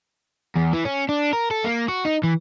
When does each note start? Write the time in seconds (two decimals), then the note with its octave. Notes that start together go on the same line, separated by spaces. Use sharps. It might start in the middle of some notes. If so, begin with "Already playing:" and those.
0.56 E2
0.73 E3
0.85 C#4
1.09 D4
1.33 A#4
1.51 A4
1.64 A#3
1.88 F#4
2.05 D#4
2.23 E3